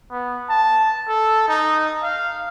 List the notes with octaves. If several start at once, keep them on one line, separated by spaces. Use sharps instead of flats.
B3
A5
A4
D#4
F5